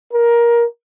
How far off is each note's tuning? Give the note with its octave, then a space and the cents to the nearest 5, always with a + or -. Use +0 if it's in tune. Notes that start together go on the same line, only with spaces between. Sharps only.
A#4 +15